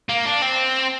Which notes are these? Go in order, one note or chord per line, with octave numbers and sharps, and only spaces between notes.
A#3
D4
C4